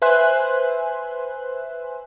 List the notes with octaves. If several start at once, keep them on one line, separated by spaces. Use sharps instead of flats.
B4 C5 E5 G#5 C6 F#6